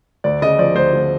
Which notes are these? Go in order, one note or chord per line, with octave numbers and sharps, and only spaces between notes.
D2 D5
C#3 D#5
F3 D5
D2 C5
D2